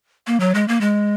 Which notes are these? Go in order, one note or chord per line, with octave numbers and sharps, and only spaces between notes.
A#3
F#3
G#3
A#3
G#3